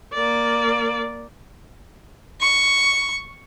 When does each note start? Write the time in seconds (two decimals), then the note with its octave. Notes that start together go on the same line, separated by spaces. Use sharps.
0.14 A#3 D5
2.41 C#6